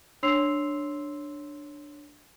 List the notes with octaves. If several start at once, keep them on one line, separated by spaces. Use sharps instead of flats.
D4 C#5 C6 E6 C7 F7